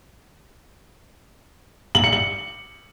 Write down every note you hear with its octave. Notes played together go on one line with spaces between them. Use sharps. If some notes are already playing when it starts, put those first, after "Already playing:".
F#7
C#7
F#7